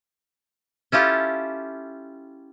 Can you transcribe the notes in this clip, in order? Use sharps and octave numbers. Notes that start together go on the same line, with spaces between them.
C#4 E4 F4 G4 A4